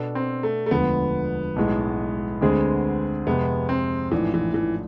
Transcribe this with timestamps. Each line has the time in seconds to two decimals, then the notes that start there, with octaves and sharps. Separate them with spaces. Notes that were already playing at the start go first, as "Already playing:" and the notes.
Already playing: B2 B3 D4 A4
0.15 C4
0.43 A3
0.66 A3
0.71 E1 D2 D3 F3 B3
1.56 B1 A2 G#3
2.41 D2 D3 G#3 C4 G#4
3.27 F2 C3 G#3 B3
3.69 C4
4.11 A1 G#2 E3 F3 A3 D4
4.34 E3
4.54 E3